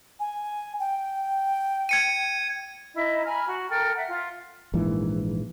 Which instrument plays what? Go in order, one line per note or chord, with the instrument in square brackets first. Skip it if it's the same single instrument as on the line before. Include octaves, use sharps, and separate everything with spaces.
[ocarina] G#5
G5
[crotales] G#6 C#7 D#7
[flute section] D#4 E4 D#5
G#5 A#5 B5 F6
F#4
A4 A#4 G5 F6
E5 F#5
F4
[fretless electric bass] A#1 G#2 E3 A#3